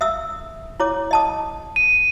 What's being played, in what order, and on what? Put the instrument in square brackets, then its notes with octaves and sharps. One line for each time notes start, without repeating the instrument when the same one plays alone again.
[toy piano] E5 D#6 E6
E4 C#5 D6
D#5 A5 D#6
[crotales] D#7